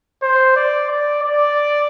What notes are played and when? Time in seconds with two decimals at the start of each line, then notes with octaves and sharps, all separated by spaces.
0.22 C5
0.56 D5
0.89 D5
1.22 D5